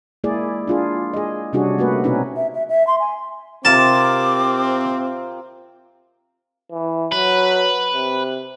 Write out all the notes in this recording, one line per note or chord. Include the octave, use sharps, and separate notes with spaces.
G#3 A#3 E4 G#4 D5
D4 F4 G#4
G#4 D#5
C3 G3 C#4 D4 F#4 G#4
A3 A#3 F#4 B4
B2 C4 C#4 D#4 B4
E5
E5
E5
C6
G#5
C3 C4 F4 A#4 A5 D6
E3
F#3 B4
C3